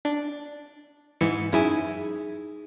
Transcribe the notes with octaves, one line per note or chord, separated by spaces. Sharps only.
D4
G#2 E3 C#7
F#2 D#4 E4 G#4 G#5